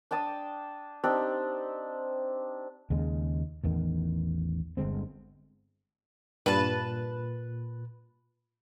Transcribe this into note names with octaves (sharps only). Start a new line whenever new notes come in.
D4 G5 A5 D#6
C4 D4 D#4 G4
D#2 C#3 G#3
A1 E2 D#3
G1 D3 G#3 C4
G2 A#2 B4 A5